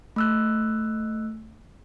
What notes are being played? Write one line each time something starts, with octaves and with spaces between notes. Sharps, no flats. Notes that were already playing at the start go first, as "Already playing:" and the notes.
A3 E6 F#6